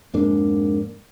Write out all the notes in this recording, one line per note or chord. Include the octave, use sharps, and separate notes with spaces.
F2 G#2 A#3 D4